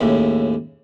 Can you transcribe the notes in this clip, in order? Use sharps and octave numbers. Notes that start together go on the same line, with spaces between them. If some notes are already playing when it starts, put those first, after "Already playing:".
D#2 A2 C#3